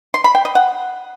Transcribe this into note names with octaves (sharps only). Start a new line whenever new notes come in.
C6
B5
G5
D#5
F#5